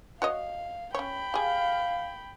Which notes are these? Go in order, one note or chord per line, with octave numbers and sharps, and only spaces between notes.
F#4 C#5 D#5 F5
C#4 C#5 G5 B5
G4 G#4 F5